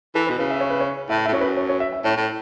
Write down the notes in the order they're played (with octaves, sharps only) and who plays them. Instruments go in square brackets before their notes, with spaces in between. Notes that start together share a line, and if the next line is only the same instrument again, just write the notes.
[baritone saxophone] E3 [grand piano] A4
[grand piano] B4
[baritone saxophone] B2
[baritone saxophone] C#3 [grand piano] B4
[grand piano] E5
C#5
B4
C#5
[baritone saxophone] A2 [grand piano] E5
[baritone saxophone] A2 [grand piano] E5
[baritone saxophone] F#2 [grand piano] C#5
[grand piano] B4
C#5
C#5
E5
E5
[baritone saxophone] A2 [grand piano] C#5
[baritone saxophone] A2